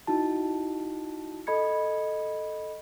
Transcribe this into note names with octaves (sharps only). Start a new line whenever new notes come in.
D#4 E4 F#4 A5
A4 D#5 B5 G#6 C#7